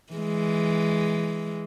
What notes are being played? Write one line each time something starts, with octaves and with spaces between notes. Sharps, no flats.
E3 G#3